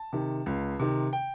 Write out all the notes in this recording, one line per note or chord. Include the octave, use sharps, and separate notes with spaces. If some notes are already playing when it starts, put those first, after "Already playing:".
Already playing: A5
C3 D#3
C#2
C3 D#3
G5